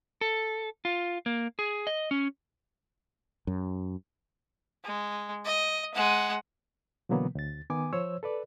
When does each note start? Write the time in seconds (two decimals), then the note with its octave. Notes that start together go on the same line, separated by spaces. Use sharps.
0.21 A4
0.85 F4
1.26 A#3
1.59 G#4
1.87 D#5
2.11 C#4
3.47 F#2
4.84 G#3
5.45 D#5
5.95 G#3 F#5
7.09 B2 D3 E3 F#3 A#3 B3
7.35 D2 A6
7.70 D#3 B3 G#5 D6
7.93 F3 C5 C#5 E6
8.23 A4 B4 D5